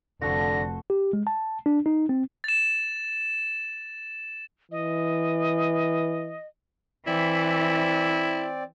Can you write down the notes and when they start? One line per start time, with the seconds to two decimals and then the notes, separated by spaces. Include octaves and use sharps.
0.21 F1 D3 F#4 A4 C5 A#6
0.90 G4
1.13 G#3
1.27 A5
1.66 D4
1.86 D#4
2.09 C4
2.44 A6 E7
4.72 E3 D#5
7.07 E3 C4 E4 D5